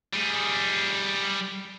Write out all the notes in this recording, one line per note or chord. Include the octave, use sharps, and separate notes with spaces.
G3 G#4